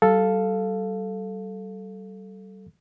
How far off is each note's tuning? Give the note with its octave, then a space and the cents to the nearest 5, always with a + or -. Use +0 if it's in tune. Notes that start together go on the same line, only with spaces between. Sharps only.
G3 -30 A4 +0 F5 -5